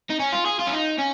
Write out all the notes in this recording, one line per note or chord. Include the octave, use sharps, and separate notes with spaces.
D#4
C#4
F4
G#4
F4
C#4
D#4
C#4